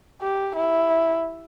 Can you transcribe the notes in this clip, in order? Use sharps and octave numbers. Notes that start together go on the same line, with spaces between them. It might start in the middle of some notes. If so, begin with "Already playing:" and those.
G4
E4